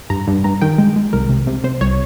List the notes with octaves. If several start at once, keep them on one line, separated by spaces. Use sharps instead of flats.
G2 A#5
G2
G2 A#5
D#3 G5
G#3
G#3
C2 A#4
C2
C3
C3 C5
C2 C#5